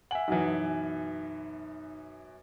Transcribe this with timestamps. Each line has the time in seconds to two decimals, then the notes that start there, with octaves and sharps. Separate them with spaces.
0.11 E5 F#5 G#5 F#7
0.28 F#2 B2 E3 D#4